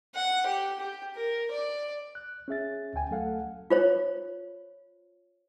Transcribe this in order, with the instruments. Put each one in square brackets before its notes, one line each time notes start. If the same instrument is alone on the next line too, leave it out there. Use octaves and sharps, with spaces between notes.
[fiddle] F#5
G4
G4
A#4
D5
[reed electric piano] F#6
C#4 G#4 E5 A6
D2 C#4 G5 G#5
F#3 A3 A4 F5 F#5
[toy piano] F4 C5 C#5